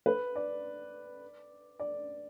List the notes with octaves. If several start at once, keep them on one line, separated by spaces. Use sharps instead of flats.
B4
D5
D5